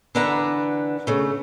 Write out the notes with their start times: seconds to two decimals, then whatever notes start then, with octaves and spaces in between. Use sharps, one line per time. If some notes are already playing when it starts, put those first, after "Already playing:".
0.15 D3 E3 D4 B4 F#5 A#5
1.07 C#3 A3